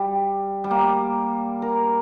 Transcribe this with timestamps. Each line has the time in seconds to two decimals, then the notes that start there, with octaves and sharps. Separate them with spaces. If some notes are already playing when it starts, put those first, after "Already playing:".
Already playing: G3
0.64 G3
0.71 A#3
1.62 A#4